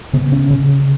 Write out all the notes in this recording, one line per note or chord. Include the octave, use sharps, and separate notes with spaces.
C#3 B3
C#4
C#3